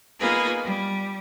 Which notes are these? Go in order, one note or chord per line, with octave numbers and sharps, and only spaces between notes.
A#3 B3 D#4 F4 G#4 B4
G3